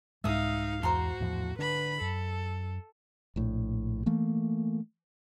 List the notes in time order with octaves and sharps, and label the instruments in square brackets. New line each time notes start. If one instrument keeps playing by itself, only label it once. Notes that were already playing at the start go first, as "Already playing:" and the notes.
[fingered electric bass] C2 G#2 G#3 [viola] D#4 F5 [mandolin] E5 D#6
[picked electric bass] E2 [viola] F#4 [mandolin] C5 A#5 C6
[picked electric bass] E2 A2 F3
[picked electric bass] D3 D4 [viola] B4 B5
[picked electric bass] F#2 [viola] A4
[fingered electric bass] A#1 A2
E3 A3 A#3